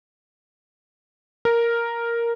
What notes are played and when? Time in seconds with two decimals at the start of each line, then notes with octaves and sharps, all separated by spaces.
1.45 A#4